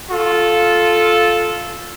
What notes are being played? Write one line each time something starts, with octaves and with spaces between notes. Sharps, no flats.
F4 A4